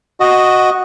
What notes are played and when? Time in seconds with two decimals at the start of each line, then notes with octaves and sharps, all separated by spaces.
0.20 F#4 D#5